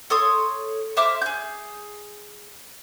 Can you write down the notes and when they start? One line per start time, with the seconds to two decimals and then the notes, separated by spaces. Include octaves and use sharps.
0.10 A4 C#5 C6 D#6
0.97 C5 E5 D6 F6
1.22 G#4 G6